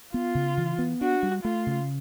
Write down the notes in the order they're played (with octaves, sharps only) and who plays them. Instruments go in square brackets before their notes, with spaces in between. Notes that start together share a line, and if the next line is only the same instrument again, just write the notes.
[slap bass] B3 [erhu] F4
[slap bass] C#3
E3
B3
[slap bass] D4 [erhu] F#4
[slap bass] G3
[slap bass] A3 [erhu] F4
[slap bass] C#3